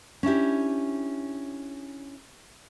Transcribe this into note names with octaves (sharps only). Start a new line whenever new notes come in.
C#4 D4 E4 G4